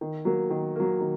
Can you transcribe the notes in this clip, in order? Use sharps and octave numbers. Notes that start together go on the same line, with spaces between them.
D#3
F#3 A#3
D#3
F#3 A#3
D#3